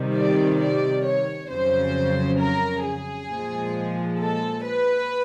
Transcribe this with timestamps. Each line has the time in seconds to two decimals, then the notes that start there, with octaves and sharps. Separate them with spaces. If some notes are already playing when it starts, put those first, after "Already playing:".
Already playing: C3 D#3 G3
0.14 D5
0.59 D5
1.04 C#5
1.49 F2 C#3 F#3 C5
2.39 A#4
2.84 G#4
3.28 A#2 F3 G#3
4.19 A4
4.64 B4